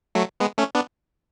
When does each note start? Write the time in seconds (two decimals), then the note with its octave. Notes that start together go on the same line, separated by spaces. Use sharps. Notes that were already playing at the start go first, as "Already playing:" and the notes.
0.15 F#3 A3
0.40 G#3 B3
0.58 A3 C#4
0.75 B3 D4